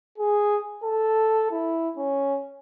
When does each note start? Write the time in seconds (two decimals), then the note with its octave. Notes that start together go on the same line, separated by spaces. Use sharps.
0.18 G#4
0.83 A4
1.51 E4
1.97 C#4